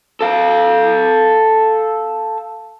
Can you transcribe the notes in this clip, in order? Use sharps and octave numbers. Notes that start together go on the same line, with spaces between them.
A4 F5